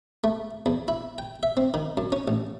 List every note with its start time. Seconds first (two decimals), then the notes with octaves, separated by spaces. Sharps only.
0.24 A3
0.66 E2
0.88 E4
1.18 G5
1.43 E5
1.57 C4
1.74 D#3
1.97 F#2
2.12 C#4
2.28 A1